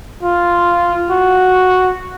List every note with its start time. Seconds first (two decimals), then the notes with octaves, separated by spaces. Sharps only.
0.23 F4
1.11 F#4